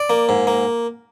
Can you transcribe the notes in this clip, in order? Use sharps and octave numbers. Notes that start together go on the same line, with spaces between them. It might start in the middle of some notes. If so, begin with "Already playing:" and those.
Already playing: D5
A#3
G#2
A#3